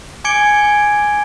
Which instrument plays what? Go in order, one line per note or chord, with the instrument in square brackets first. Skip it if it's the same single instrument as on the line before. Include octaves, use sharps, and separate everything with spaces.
[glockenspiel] G#5 D6 G#6 C#7 D7 G7